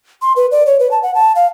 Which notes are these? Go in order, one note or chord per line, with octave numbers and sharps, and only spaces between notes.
C6
B4
D5
C#5
B4
A5
F#5
A5
F5